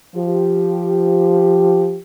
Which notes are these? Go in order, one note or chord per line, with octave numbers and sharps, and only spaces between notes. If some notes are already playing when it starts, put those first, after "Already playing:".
F3 G4